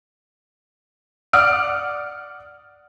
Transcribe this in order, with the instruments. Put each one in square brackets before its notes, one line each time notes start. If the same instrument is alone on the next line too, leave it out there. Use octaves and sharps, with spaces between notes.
[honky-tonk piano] D5 F#5 D#6 F6 D7